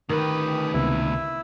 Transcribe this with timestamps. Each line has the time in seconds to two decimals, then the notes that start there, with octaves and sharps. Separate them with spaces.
0.09 D2 D#3 G4 B4 D#6
0.74 C#2 C3 B3 E4 E5